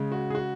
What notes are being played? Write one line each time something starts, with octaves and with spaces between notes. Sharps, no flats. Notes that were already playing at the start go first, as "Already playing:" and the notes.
Already playing: C#3 G#3
F#4
G#4
F#4